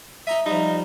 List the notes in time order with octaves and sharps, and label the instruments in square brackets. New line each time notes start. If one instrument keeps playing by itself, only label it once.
[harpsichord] D#4 A#5 D#6 [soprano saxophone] E5
[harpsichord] F3 G3 [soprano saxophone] D#4